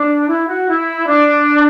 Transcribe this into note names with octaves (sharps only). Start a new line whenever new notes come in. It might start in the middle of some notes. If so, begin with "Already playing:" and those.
Already playing: D4
E4
F#4
E4
D4